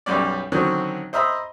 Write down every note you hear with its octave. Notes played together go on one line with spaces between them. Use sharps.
B1 F#2 G3 C#4 D5
D3 D#3 F#3 C4 C#4
C5 D#5 E5 A#5 B5